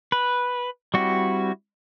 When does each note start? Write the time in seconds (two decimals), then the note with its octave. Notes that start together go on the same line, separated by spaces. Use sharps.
0.12 B4
0.94 G3 C4 E4 F#4